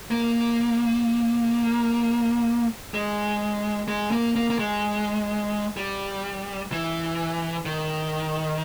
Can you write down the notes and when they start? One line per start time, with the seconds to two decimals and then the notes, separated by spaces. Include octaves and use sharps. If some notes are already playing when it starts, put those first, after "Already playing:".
0.11 A#3
2.94 G#3
3.88 G#3
4.11 A#3
4.35 A#3
4.50 A#3
4.59 G#3
5.77 G3
6.72 E3
7.65 D#3